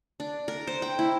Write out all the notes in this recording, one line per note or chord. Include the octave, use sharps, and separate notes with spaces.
D4
A#4
C5
G5
E4